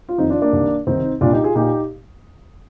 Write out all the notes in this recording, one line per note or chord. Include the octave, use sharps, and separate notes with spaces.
F4
F2 D#3 C4 D#4
D4 F4
A#3 D4
C2 C3 D#3
C2 C3 D#3 C4 D#4
C2 A#2 D4 F4
D#4 G4
F4 G#4
A#2 D#4 G4